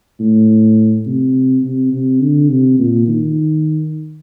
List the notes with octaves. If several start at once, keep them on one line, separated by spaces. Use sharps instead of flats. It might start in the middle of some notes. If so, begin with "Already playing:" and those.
A2
C3
C3
C3
D3
C3
A#2
D#3